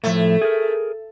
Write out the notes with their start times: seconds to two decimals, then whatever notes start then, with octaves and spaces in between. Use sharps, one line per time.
0.04 A2 C#3 F3 A3
0.42 G#4 A#4